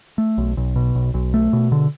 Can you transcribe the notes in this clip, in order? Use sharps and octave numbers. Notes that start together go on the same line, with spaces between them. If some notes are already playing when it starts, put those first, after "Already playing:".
A3
B1
B1
B2
B1
B1
A3
B2
D3